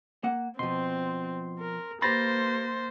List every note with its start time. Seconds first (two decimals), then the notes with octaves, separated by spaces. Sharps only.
0.24 A#3 F#5
0.59 B2 F3 C4 C6
1.59 A#4
2.02 A#3 G4 B4 C5 B5 C6 A6 A#6